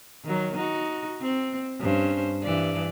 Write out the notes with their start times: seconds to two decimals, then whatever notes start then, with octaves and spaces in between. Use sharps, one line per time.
0.24 D#3 F#3
0.56 D#4 F#4
1.20 C4
1.80 G2 C#4 C5
2.43 G2 E3 D5